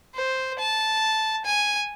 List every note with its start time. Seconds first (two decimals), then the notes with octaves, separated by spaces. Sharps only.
0.15 C5
0.59 A5
1.45 G#5